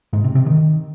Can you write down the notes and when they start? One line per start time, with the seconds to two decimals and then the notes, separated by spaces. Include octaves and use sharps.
0.13 G#2
0.24 C3
0.35 C3
0.46 D#3